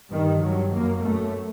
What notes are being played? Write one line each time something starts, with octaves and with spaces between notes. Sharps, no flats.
G2 D#3
G2 F#3
F#2 A#3
F#2 A3